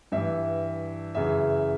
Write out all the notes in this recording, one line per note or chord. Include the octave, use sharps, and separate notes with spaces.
G2 E3 E5
F#2 C#3 E3 E5